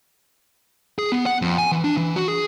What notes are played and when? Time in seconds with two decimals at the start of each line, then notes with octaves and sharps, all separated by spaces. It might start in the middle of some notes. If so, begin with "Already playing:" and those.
0.99 G#4
1.12 B3
1.26 F#5
1.42 F2
1.58 G#5
1.72 E3
1.84 D4
1.97 E3
2.16 F#4
2.28 G#4